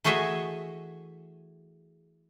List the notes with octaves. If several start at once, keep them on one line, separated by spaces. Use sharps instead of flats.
E3 A3 F#4 G#4 D#5 E5